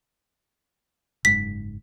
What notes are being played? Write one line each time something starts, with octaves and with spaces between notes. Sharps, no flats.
F#1 G#2 B6